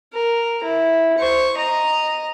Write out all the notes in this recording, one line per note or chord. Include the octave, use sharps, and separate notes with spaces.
A#4
E4
C5 C#6
D#5 A#5